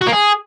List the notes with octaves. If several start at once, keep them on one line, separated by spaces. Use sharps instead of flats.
F#4
A#3
G#4